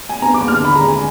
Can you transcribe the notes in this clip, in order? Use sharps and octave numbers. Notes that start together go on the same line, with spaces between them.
G#5
B3 A#5
D6
D#2
F6
D3 B5
A#5
G#3
G#5